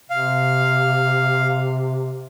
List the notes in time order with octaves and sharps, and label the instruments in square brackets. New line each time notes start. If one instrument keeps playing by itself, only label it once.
[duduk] C3 [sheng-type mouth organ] F5